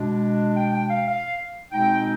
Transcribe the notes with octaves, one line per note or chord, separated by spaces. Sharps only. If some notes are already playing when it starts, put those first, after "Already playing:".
Already playing: B2 G#3 D4
G5
G5
F5
F5
B2 G#3 C4 D#4 G5